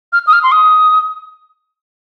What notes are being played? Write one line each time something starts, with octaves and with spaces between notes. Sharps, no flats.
F6
D#6
F6
C6
D#6